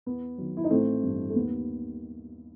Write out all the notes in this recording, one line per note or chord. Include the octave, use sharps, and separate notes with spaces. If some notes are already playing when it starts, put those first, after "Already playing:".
E2 B3
D#3 F#3
E4
D#4
A1 A3 C4
G2 E3
A3
D#2 B3